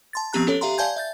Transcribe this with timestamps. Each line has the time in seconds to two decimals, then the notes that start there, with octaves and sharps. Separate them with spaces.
0.13 A5 C6 A6
0.33 F3 B3 C4 G4 A#5 F#6
0.47 C#4 A4 C#5
0.61 G4 E5 F5 A#5 C6
0.78 D5 F5 G#5 A5 G6 G#6
0.96 E5 G6 A6